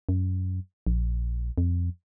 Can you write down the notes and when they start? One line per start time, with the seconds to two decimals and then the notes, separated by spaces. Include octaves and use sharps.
0.09 F#2
0.87 A#1
1.58 F2